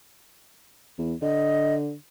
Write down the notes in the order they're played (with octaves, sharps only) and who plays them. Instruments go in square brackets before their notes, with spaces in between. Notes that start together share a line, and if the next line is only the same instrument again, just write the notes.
[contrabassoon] E2
[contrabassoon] D3 [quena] D#5